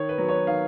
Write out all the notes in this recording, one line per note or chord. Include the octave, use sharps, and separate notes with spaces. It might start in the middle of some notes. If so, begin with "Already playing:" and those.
Already playing: D#3 C#5
B4
F#3 B3
C#5
D#3 F5